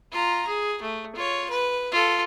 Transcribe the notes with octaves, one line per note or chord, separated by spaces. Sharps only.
F4 A#5
G#4
A3
F4 C#5
B4
F4 A4